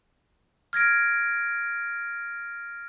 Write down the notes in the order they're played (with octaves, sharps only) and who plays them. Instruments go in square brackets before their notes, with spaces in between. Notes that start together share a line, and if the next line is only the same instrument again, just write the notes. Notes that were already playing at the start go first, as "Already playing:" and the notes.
[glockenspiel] F6 G#6 A#6 D7